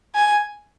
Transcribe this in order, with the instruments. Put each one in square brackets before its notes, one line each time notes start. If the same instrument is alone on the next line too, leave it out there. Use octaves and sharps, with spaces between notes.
[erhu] G#5